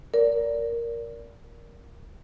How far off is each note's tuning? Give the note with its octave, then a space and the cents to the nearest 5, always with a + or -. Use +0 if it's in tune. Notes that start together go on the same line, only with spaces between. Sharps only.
A#4 +5 D5 -20